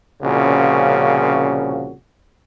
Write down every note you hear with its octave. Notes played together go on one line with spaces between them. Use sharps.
C2 A#2 C#3 F3 C#4 F#4